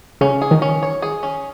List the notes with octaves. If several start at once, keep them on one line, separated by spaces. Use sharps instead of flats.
C#3 C#4
G#4
D#3
C#4
C#5
G#4
C#4